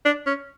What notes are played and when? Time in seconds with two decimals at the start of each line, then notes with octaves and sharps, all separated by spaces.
0.05 D4
0.26 C#4